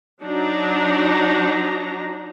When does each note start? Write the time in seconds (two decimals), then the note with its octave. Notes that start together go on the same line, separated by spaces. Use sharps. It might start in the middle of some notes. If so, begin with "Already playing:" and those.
0.21 F#3 D4 D#4 A#5